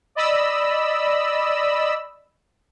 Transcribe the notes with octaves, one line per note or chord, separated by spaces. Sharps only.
D5 D#5 B5 E6